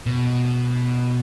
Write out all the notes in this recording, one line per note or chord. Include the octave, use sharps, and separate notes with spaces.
B2